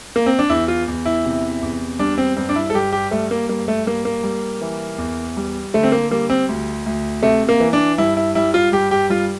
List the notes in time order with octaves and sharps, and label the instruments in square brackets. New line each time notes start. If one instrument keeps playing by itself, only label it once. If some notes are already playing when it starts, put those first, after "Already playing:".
[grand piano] A#3
C4
D4
E2 E4
F4
E2
E4
C3
E2
G3 D4
C4
G2 C4
D4
E4
A4
G2 G4
G4
G3 A3
A#3
G2 A#3
A3
G3 A#3
A#3
G3
E3
E2
G3
D3 A3
C4
A#3
G3 A#3
C4
D2
D2
C3 A3
A#3
E3
D4
G2 E4
E4
G3 E4
F4
G2 G4
G4
G3 F4